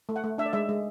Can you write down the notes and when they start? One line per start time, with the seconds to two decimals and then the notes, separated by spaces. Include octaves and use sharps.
0.09 A3
0.16 F#5
0.24 A3
0.38 D4 E5
0.46 D5
0.53 G#3 E5
0.69 G#3